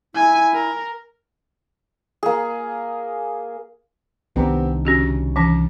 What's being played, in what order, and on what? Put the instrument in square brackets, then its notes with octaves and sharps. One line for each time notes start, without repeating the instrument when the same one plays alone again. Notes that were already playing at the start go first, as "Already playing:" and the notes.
[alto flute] E4 [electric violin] G#5
[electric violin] A#4
[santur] A#3 G#4
[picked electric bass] C2 D#3 D4 [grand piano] B3 C4 G4
[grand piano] C#3 [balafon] C#4 F#4 G4
[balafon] E3 C#4 [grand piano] A5